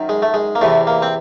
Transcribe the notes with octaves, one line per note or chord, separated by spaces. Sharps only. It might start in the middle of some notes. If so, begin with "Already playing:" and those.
Already playing: F#2 D#3
G#3
A3
G#3
A#3
E2 C3 E3 A3
A#3
C4